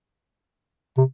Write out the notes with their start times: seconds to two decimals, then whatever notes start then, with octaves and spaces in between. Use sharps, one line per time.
0.97 C3